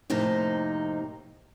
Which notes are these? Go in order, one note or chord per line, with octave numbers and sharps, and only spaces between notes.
F2 A2 C3 A#3 D#4